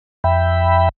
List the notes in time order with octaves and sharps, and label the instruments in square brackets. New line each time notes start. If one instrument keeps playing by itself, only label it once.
[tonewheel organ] F2 E5 G5 B5